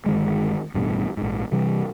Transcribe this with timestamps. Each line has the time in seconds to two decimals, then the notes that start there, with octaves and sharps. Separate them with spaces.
0.06 G1 D#3 G#3
0.74 A1 G2 B2
1.17 A#1 G#2
1.52 C3 E3 G3